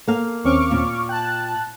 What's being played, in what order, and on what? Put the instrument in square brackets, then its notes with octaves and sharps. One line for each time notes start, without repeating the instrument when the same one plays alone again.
[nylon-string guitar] A#3 F5 [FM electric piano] A4
[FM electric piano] D#2 C4 C#4 [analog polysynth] C#6 D6 F6
[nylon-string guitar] A#2
[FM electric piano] G5 [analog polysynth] A5 F#6